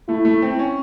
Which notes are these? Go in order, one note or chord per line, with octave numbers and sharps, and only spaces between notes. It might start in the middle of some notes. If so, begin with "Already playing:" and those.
A3 E4
A3
C4
C#4